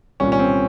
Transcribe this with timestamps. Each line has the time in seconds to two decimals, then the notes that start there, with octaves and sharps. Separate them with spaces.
0.20 C2 A#2 C#4
0.32 C#4
0.39 C4